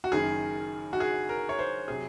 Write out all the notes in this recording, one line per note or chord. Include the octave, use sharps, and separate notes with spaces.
F#4
F#1 F#2 D#3 G#4
F#4
G#4
A#4
C#5
C5
C3 F#3 G#4